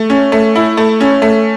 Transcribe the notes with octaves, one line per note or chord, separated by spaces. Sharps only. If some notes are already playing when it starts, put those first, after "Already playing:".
Already playing: A3
C#4
A3
E4
A3
C#4
A3